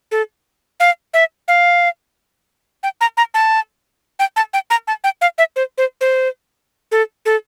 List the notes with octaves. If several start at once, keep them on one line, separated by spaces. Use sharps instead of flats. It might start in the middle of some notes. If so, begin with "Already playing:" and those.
A4
F5
E5
F5
G5
A#5
A#5
A5
G5
A5
G5
A#5
A5
G5
F5
E5
C5
C5
C5
A4
A4